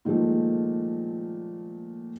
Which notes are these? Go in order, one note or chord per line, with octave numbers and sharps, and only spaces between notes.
A#2 D#3 F3 G#3 A3